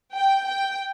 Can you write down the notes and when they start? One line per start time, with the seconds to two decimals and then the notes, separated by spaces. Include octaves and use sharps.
0.17 G5
0.48 G5